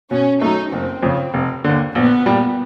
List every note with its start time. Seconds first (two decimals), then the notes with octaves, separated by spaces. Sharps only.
0.11 B2 C#4
0.41 F#3 A3 D#4
0.72 F#1 C4
1.03 F2 C#3
1.34 F1
1.64 D#2 D3
1.95 A#1 B3
2.26 A#2 G3